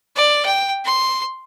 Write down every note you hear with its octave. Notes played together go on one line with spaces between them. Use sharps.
D5
G5
C6